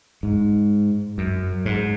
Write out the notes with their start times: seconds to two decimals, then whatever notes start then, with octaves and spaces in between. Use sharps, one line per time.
0.23 G#2
1.18 F#2
1.65 G#2